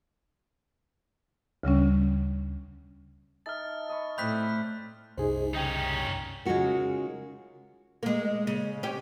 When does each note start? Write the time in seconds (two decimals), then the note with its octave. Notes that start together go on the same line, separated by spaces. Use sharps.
1.63 D2 C#3 G3 C#4
3.46 D#4 E5 A5 F6 A6
3.89 D#5 B5 C#6
4.18 A2 C4 D5 D#5 B5 F#6 G6 B6
5.18 C2 F#2 C3 D#4 G#4 C5
5.54 C#3 C#4 D#4 G5
6.45 C#3 G#3 D#4 F4 F#4 A#4
8.03 G#3 A#3
8.47 C#3
8.83 C#4 G4